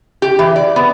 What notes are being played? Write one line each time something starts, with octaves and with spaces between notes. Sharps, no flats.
G4
E3
D5
B3